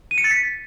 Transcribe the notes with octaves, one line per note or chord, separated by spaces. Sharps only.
D#7
C#7
A6
B6